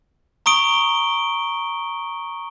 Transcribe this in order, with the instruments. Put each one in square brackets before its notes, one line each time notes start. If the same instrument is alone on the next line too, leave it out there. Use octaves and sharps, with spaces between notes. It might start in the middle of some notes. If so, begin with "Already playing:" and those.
[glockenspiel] A#5 C#6 D#6 D7 G7